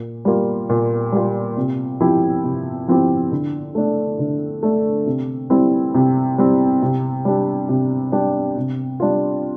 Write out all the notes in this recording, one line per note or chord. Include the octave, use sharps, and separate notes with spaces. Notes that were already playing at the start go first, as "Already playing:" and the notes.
Already playing: A#2
G3 A#3 F4
A#2
G3 A#3 F4
C3
F3 C4 E4 G4
C3
F3 C4 E4 G4
D3
A3 D4
D3
A3 D4
C3
G3 C4 E4
C3
G3 C4 E4
C3
G3 D4 G4
C3
G3 D4 G4
C3
G3 D4 F4